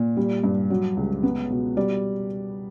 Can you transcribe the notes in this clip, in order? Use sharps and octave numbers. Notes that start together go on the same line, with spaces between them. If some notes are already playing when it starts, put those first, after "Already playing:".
Already playing: A#2
G3
G2
F#3
C#2
B3
B2
G3 D5